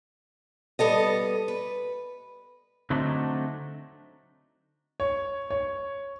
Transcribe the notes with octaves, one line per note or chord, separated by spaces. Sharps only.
G3 B3 A4 D#5
B4
D3 F#3 A3 C4 D4 D#4
C#5
C#5